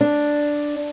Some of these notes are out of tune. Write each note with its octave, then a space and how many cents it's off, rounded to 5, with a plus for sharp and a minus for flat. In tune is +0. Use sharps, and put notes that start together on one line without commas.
D4 +0